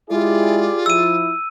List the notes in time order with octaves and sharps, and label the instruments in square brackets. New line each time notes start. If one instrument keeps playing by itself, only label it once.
[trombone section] G#3 E4 [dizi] F4 [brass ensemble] G4 G#4 D5
[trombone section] F3 E4 [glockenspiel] E6 D#7